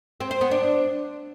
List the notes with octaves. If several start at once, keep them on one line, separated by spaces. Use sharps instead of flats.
C4
C5
B3
D4